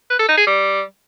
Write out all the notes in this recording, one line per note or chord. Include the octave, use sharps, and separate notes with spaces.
B4
A4
D#4
G#4
G3